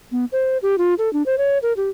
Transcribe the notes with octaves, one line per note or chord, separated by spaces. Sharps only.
B3
C5
G4
F4
A4
D4
C5
C#5
A#4
G4